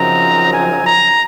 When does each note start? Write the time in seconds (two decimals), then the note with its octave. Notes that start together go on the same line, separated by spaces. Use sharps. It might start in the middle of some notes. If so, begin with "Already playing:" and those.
Already playing: F#2 C#3 F3 C4 D#4 A#5
0.52 G#5
0.85 A#5